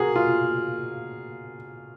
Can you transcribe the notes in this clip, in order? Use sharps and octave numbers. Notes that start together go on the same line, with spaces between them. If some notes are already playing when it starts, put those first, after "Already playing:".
Already playing: F#4 G#4 A#4
F4